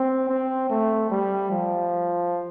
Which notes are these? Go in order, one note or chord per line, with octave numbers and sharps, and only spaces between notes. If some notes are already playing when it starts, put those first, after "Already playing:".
Already playing: C4
C4
A3
G3
F3